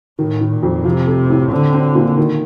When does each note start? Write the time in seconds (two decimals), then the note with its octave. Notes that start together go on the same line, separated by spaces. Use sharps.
0.19 A2 D#3
0.41 D#3
0.52 A#2
0.63 F2
0.85 C3 F3
1.07 A3
1.30 A2
1.51 D3 C4
1.73 C4
1.95 A#2
2.17 D#3